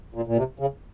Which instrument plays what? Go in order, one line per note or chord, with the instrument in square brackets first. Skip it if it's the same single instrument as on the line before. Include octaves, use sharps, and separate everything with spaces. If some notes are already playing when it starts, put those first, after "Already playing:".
[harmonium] A#2
A#2
C3
C#3